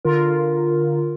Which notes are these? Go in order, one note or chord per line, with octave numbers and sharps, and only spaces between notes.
D3 F4 A#4